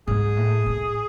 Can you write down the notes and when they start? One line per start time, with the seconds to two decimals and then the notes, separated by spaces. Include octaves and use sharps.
0.07 G#2 G#4
0.37 A2
0.66 A2